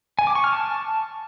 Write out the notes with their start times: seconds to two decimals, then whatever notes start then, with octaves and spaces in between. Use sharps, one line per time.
0.19 G#5
0.27 D6
0.35 C#6
0.44 F6
0.52 A5